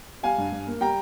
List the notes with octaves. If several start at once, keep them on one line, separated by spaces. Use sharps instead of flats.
G3 F5 G#5
G2
G2
A#3
G3 G5 A#5